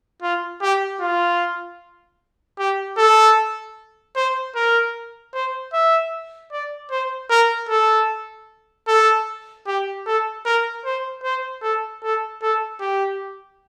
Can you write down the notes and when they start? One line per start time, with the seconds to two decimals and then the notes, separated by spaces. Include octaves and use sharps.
0.22 F4
0.62 G4
1.01 F4
2.59 G4
2.98 A4
4.16 C5
4.55 A#4
5.34 C5
5.73 E5
6.52 D5
6.91 C5
7.30 A#4
7.69 A4
8.88 A4
9.67 G4
10.06 A4
10.45 A#4
10.85 C5
11.23 C5
11.62 A4
12.03 A4
12.42 A4
12.81 G4